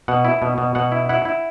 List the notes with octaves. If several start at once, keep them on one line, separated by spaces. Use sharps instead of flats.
B2 F#5
E4
B2
B2
B2 F#5
E4
E4 F#5
E4